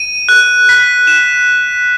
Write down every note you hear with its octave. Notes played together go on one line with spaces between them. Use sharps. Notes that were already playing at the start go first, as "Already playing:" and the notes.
Already playing: D#7
F#6
B6
E7